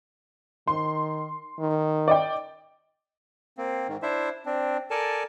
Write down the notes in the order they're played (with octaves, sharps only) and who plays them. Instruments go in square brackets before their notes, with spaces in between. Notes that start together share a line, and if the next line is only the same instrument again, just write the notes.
[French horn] D#3 [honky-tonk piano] C6
[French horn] D#3
[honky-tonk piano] D5 D#5 G5
[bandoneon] A#3 C4
G#2 D#3
D4 E4 C5 E5
C4 D4
A4 A#4 D5 G#5 A5